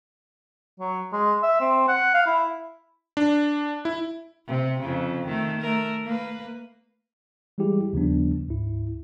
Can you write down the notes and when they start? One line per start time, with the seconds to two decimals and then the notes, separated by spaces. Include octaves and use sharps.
0.80 F#3
1.13 G#3
1.43 E5
1.61 C4
1.88 F#5
2.14 F5
2.27 E4
3.17 D4
3.85 E4
4.47 C3
4.80 F2 C#3
5.25 D#3 A3
5.61 A3 A#4
6.06 A#3 B4
7.58 E3 G3 G#3 E4 G4 G#4
7.93 D#2 C#3 F3 G3 B3 D4
8.48 D2 G#2 E4